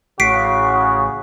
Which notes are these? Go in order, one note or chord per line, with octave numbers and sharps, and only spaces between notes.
A1 C#3 F#4 B6 C7 D7